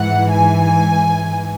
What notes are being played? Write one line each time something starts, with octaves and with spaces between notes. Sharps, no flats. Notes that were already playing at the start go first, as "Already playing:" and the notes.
Already playing: G#2 E3 F#5
G#5